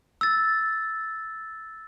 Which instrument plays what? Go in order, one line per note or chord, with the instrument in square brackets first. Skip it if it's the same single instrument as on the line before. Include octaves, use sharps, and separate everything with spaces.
[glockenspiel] E6 A6